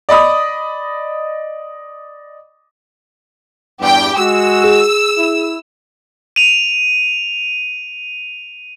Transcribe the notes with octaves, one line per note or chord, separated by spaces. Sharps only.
D5 D#5 B5 D#6
E2 G2 G4 G5
G#3 F#4 E6
G#4
E4
D#7 F7